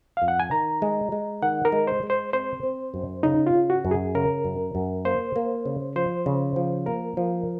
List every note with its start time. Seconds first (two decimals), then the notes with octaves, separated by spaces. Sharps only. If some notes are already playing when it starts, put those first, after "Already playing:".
0.17 F2 F5
0.28 F#5
0.40 G#5
0.51 D#3 A#5
0.82 G#3
1.12 G#3
1.42 D#3 F#5
1.65 A#4
1.72 G#3
1.87 C5
2.03 G#3
2.10 C5
2.33 C4 C5
2.63 C4
2.94 F#2
3.23 C#3 D#4
3.47 F4
3.54 C#3
3.70 F#4
3.85 F#2
3.91 G#4
4.15 C#3 A#4
4.45 F#2
4.75 F#2
5.05 A#3 C5
5.36 A#3
5.66 C#3
5.96 F3 C5
6.26 C#3
6.56 F3
6.86 A#3 A#4
7.17 F3